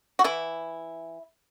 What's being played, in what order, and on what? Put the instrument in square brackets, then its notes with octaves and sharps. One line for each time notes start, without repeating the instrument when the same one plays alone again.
[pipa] F#4
E3 E4